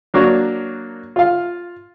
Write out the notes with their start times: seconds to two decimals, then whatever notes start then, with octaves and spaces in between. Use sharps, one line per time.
0.14 F#3 A#3 D4 F#4 C#5
1.16 F4 F5